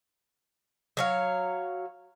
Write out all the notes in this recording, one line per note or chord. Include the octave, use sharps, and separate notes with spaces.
F#3 C#5 F5